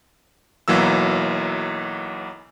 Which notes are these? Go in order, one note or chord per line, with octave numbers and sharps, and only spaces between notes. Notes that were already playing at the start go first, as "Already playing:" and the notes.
B1 E3 F#3 A#3 E6